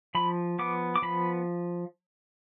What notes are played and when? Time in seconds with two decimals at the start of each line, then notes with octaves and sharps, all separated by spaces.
0.15 F3 B5
0.59 B3 D6
0.96 D6
1.02 F3 B5